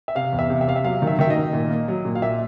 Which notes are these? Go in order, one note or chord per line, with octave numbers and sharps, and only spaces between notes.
E5
C3 F5
E2
E5
C3
E5
C3 F5
E5
F#3 F5
D#3
E5
D#3 E5
D#5
D#3
A#2
A#3
F#3
A#2
F5
A#2 E5